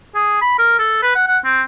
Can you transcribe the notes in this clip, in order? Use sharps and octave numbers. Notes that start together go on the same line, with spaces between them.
G#4
B5
A#4
A4
B4
F#5
F#5
C4